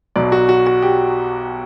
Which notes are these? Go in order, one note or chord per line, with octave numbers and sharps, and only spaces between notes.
B1 B2 F#3 D5
F#4
F#4
F#4
G4